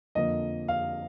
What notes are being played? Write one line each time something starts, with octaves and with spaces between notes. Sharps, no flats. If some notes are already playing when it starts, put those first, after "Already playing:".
F2 D3 F3 A#3 D#5
F5